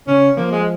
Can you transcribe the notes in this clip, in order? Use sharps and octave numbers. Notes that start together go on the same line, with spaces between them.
C#3 C#4
F3 A#3
G#3